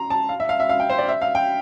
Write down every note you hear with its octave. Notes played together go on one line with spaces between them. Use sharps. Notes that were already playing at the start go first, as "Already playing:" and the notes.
Already playing: A#5 C6
A5
F5
E5
F5
E5
F5
G5
C5
D5
E5
F5
G5